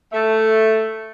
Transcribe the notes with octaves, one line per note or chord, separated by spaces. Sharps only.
A3